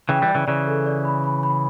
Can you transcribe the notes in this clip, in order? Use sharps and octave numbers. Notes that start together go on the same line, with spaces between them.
C#3 E3 G5
E3 G3
D5
C#3 E3
C#3 E3 D5
A4
D5
B5
B5
B5